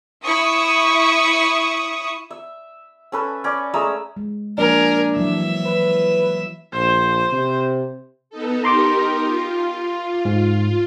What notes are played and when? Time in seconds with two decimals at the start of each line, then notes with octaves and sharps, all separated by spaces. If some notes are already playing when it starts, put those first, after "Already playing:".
0.24 E4 C#6 D#6
2.31 E5
3.12 C#4 A4 B4
3.44 C#4 D5
3.74 G#3 A3 A#5 E6
4.17 G#3
4.58 F3 A#3 D4 A#4 G#5
5.17 E3 F#3 E5
5.66 B4
6.73 A#1 C5
7.32 C3
8.30 B3 D#4 A4
8.64 D#4 G4 A#4 A#5 C6 D6
9.25 F4
10.25 G#2